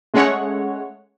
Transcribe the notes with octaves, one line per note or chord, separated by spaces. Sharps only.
G#3 A3 C#4 C#5 F#5